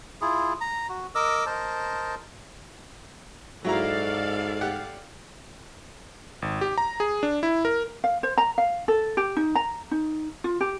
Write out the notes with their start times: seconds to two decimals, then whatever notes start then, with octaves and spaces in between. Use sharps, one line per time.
0.21 E4 F4 G#4
0.61 A#5
0.89 F#4
1.15 A#4 D#5 D6 E6
1.46 A#4 C5 D#5 A5
3.65 G#2 F#3 E4 A4 D5 F5 A#5
4.61 G4 F#5
6.42 G#1
6.61 G4
6.78 A#5
7.00 G#4
7.23 D4
7.43 E4
7.65 A#4
8.04 F5
8.23 C5
8.38 A#5
8.58 F5
8.88 A4
9.17 G4
9.37 D#4
9.55 A#5
9.91 D#4
10.44 F4
10.61 G4